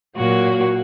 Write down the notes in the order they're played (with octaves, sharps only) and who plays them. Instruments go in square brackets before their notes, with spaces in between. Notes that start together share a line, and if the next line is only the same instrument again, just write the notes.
[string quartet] A#2 F#3 A#3 F#4